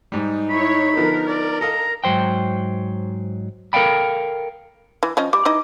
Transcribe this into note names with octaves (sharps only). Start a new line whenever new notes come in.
G#2 G3 D#4
E4 C#5 B5
D3 F3 B3 A#4
D5
A4 D#5 F5 A#5
G#2 D#3 F#3 C5 G5
A4 A#4 D5 F5 G5 B5
E3
F3 C#4 D#5
G3 D6
E3 D#4 D#5